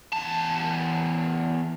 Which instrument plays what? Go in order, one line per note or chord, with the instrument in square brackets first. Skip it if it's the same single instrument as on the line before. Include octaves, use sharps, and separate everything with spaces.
[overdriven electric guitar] E2 A5